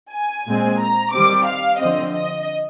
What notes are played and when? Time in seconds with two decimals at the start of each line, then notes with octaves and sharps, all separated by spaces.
0.12 G#5
0.46 A#2 G#3 C4
0.80 A#5
1.12 D#3 G3 C4 D6
1.46 F5
1.80 D3 F3 C4 D#5
2.13 D#5